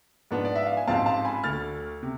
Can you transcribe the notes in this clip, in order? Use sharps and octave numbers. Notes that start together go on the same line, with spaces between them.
G#2 F3 B3 D4
D5
E5
F5
G#5
A1 G#2 F3 G#3 C4 F5 A5
F5 A5
G#5 B5
D2 D3 A3 F6 A6
C3